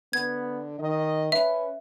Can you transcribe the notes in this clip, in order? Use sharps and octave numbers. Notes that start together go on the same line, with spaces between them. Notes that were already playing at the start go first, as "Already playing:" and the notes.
D3 B3 G#6
D#3 D#5
C#4 B4 E5